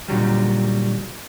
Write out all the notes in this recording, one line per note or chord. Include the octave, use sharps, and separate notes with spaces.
A#2 D3 F#3 G3